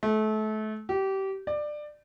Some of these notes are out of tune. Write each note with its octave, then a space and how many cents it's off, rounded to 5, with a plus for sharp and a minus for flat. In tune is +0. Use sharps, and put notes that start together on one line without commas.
A3 -30
G4 -25
D5 +20